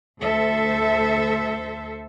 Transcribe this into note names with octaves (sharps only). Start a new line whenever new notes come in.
D2 A4 C5 E5